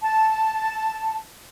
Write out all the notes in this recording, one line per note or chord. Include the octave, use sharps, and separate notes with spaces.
A5